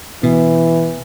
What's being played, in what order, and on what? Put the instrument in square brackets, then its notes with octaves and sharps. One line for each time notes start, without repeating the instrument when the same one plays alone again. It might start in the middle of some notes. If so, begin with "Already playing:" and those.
[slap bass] B2 [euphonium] E3